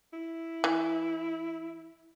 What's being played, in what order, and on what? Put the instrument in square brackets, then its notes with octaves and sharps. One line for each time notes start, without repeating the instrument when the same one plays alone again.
[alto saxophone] E4
[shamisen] E3